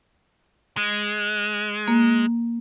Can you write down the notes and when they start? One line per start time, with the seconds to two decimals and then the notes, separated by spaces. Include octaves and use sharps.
0.77 G#3
1.88 A#3